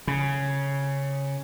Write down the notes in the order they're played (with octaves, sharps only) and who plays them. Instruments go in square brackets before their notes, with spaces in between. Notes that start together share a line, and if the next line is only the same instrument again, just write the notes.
[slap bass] C#3